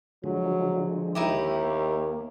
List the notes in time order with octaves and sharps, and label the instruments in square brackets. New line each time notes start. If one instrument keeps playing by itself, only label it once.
[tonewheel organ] D3 F3 G#3 [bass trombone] F#3
[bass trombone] D#2 [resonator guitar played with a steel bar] D#4 E4 G4
[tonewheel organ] A#3